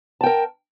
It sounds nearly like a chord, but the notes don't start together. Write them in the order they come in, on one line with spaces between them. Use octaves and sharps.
A5 G5 A#4